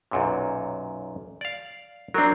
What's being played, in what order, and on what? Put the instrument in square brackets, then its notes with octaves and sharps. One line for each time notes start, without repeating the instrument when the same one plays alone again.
[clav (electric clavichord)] B1 F#2 A#2
D5 F5
[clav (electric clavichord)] F#3 C4 [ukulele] D4 A#4